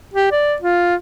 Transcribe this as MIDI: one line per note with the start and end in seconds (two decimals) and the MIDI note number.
0.14 0.31 67
0.32 0.56 74
0.62 0.96 65